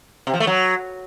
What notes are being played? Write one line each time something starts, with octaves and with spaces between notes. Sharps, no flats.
C3
F3
A3
F#3